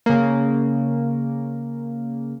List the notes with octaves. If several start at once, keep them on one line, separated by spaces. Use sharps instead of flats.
C#3 A#3